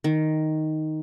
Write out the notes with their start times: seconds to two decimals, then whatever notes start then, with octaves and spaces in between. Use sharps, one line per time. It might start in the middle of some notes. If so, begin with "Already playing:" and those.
0.04 D#3